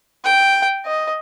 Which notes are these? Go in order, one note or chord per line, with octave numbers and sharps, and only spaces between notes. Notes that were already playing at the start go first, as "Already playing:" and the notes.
G5
D#5